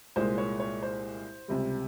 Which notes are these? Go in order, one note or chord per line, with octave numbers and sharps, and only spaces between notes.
C2 A#2 G#3 C5
C#5
C#5
C5
C#2 C3 G3